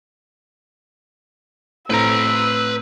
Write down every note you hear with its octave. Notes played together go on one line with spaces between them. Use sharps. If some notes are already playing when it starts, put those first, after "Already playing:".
A2 C4 B4 A#5 E6 D7